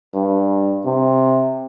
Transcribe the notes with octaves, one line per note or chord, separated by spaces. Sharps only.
G2
C3